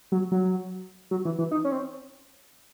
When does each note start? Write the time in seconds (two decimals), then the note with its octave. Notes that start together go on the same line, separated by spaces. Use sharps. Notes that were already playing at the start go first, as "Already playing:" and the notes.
0.12 F#3
0.32 F#3
1.11 F#3
1.25 E3
1.38 E3
1.51 D#4
1.65 C#4
1.72 C4